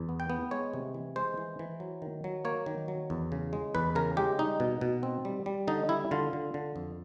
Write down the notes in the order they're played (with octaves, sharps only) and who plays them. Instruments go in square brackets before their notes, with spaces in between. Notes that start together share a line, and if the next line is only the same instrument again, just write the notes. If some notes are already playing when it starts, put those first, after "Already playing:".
Already playing: [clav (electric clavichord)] E2
B3
G5
B3
G#3 C#5
C3
E3
G#3 C5
E3
E3
F#3
D#3
F#3
A#3 C#5
D#3
F#3
E2
C#3
G#3
E2 B4
C#3 A#4
G#3 G4
G3 D#4
B2
B2
C4
G3
G3
D3 D#4
G3 E4
D3 F4
D3
D3
F2